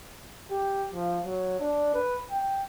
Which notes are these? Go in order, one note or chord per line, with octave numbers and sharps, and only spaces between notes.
G4
F3
F#3
D4
B4
G5